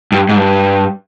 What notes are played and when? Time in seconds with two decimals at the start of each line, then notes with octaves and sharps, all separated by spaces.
0.12 G2
0.29 G#2
0.37 G2